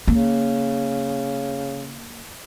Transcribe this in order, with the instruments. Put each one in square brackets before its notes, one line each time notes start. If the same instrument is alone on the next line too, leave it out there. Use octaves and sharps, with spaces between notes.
[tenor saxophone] C#3 [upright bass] A#3